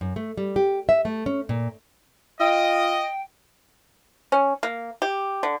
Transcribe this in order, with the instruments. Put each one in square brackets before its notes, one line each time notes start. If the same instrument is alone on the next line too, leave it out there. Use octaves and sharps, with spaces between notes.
[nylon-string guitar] F#2
A3
G3
G4
E5
A3
C#4
A#2
[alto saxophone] F4 [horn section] D#5 [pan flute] G5
[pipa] C#4
A#3
G4
D3